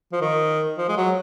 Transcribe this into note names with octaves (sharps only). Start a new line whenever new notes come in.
F3
D#3
F3
G#3
F#3